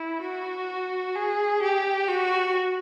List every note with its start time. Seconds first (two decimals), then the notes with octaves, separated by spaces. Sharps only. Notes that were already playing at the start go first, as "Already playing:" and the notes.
Already playing: E4
0.21 F#4
1.15 G#4
1.62 G4
2.08 F#4